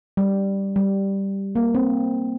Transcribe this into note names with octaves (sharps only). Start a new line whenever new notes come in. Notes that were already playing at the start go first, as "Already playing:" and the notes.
G3
G3
A#3
C4